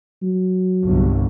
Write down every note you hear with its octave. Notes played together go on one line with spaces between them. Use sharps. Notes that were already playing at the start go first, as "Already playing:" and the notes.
F#3
G1 C2